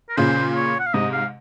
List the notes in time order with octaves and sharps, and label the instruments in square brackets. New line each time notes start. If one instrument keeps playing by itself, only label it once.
[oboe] A#4
[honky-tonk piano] A#2 C#3 [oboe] C5
[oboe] C#5
F#5
F5
[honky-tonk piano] G#2 C3 [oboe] D#5
[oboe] F5